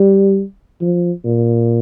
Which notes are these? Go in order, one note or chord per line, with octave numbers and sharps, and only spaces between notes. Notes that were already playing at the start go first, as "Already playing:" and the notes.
Already playing: G3
F3
A#2